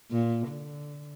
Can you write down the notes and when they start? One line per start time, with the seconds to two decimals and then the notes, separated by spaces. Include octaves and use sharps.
0.11 A#2
0.47 D3